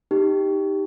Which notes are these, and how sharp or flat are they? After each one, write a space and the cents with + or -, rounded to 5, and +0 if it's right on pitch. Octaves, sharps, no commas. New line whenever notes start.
D#4 +0 G4 +0